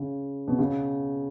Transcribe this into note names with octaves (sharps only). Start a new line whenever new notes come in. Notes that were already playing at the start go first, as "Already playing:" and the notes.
Already playing: C#3
B2
C#3